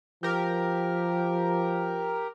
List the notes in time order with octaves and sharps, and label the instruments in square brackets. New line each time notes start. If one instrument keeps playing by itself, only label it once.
[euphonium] F3 [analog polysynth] G4 A#4